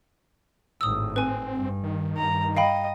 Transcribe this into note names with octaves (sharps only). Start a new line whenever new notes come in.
G#1 A2 D#6 E6
C4 B4 G#5
G2
D#3
G2 A#5
D#5 F5 G5 B5